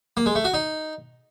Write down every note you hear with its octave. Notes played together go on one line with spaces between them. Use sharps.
A#3
G#3
A3
F#4
D#4